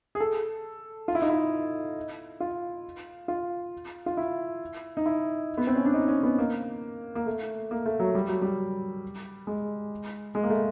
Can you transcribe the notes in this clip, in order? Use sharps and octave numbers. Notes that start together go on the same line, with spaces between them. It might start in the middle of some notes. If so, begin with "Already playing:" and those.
G#4
A4
F4
E4
D#4
E4
F4
F4
F4
E4
D#4
E4
B3
C4
C#4
D4
D#4
C#4
B3
A#3
A#3
A3
A#3
A3
F#3
G3
F#3
G3
G#3
G#3
A#3
A3